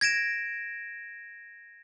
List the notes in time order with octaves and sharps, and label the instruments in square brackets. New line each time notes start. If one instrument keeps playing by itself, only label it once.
[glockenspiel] G#6 A#6 D7 E7